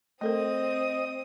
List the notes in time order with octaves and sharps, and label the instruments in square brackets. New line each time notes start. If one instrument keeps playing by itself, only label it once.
[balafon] A3 A4 A#4 [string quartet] C4 D#6 [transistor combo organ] D#5